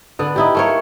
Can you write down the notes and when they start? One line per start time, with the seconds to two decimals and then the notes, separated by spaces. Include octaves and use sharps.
0.19 D3 B3
0.36 D#4 E4 G4
0.55 A3 A#3 C#5